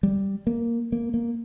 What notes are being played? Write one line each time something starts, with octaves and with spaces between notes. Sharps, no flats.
G3
A#3
A#3
A#3